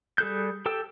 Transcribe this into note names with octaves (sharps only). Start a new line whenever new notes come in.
G3 G#4 A4 F#6 G6
G4 A4 G5 E6